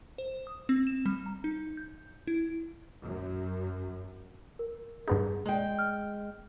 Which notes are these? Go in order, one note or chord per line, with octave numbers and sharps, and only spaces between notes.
C5
D#6
C4
E7
G3
A#5
D#4
G6
E4
F#2
A#4
G2 B3 D#4 G#4
G#3 G5
F6